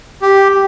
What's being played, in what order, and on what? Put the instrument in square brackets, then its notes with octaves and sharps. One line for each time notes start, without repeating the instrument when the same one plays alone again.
[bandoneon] G4